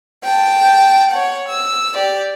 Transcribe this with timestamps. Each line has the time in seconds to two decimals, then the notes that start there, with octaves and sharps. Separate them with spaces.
0.24 G5 A5
1.11 C#5 F#5
1.48 E6
1.94 G4 D5